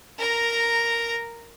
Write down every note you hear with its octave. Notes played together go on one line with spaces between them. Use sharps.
A#4 A#5